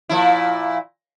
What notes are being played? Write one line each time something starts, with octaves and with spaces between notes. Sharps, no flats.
A#2 F3 E4